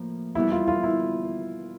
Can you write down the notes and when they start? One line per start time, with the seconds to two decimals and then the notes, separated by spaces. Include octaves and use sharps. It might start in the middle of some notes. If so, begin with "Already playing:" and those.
Already playing: A2 F3 A#3
0.35 E2 B2 G3 B3 E4
0.52 F4
0.68 F4
0.83 E4